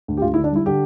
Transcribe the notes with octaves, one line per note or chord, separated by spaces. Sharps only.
D2
G4
D2 F4
E4
D3
D4
G3 E4
D3 G4